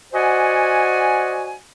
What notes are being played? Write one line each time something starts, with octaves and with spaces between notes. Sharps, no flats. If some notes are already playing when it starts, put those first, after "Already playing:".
F#4 C5 D5 D#5 F#5 G#5